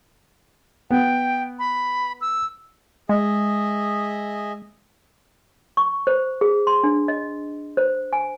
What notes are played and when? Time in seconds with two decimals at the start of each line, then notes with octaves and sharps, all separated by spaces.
0.91 B3 G5
1.59 B5
2.21 E6
3.09 G#3 G#4 D#5 E5
5.77 C#6
6.07 C5
6.41 G#4
6.67 C6
6.84 D4
7.08 D#5
7.77 C5
8.13 G#5